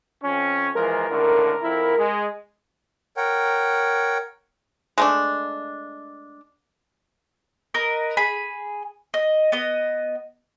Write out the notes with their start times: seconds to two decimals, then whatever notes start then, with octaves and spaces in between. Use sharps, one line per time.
0.22 F2 C#4
0.75 E3 F3 G#3 A#4
1.10 C#2 A2 D3
1.61 F2 E4
1.97 G#3
3.17 A#4 C#5 F#5 G5
4.98 G#3 A3 D4
7.74 A#4 B4 D#5
8.17 G#4 B5
9.14 D#5
9.52 B3 D#5